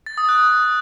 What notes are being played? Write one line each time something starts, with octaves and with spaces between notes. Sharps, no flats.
A6
D#6
F#6